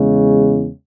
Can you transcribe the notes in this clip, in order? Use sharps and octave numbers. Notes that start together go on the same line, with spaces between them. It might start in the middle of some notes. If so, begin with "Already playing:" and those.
Already playing: E2 C#3 G#3